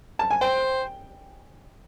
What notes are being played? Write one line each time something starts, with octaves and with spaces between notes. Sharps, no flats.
A5
G#5
C5 G5